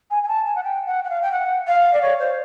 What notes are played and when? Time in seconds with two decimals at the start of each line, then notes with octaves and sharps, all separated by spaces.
0.10 G#5
0.22 G#5
0.28 A5
0.46 G#5
0.55 F#5
0.63 G5
0.86 F#5
1.04 F#5
1.09 F5
1.21 G5
1.32 F#5
1.67 F5
1.93 D5
2.01 C#5
2.19 C5